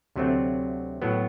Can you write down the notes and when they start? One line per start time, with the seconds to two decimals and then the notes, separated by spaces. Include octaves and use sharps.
0.16 D2 C3 F#3 A3 C4
1.02 A2 F#3 B3